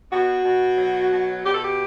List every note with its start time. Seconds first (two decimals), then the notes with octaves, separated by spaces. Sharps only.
0.11 B2 F#4
0.45 B2
0.78 F#3
1.11 B2
1.45 B2 G4
1.53 A4
1.62 G4